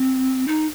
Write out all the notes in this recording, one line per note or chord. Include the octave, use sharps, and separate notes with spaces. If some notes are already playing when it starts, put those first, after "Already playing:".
Already playing: C4
D#4